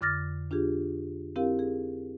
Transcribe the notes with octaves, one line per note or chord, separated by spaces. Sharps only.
F2 D3 D6 F6 A6 A#6
D4 F4 G4 G#4
C4 E4 G4 A#4 F5
G#4